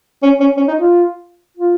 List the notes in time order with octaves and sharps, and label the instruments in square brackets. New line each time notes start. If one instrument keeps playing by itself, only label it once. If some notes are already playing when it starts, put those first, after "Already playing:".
[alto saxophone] C#4
C#4
C#4
D#4
F4
F4